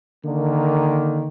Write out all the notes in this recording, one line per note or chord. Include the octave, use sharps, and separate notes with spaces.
D3 D#3 A#3